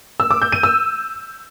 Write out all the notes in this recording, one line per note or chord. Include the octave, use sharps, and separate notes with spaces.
E6
D6
G6
D#7
E6